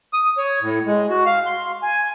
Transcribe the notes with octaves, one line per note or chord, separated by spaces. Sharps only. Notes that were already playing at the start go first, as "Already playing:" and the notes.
D#6
C#5
A2
G#3
F#4
F5
C6
G#5